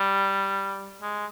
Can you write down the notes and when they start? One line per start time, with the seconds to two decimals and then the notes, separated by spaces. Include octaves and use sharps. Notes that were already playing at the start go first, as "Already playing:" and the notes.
Already playing: G3
1.02 G#3